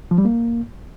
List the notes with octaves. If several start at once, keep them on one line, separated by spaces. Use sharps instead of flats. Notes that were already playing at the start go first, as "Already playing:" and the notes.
F3
G3
A#3